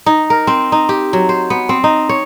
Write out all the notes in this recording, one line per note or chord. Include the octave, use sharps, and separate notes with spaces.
D#4
A#4
C4
D#4
G4
F#3
C5
B3
C4
D#4
C#5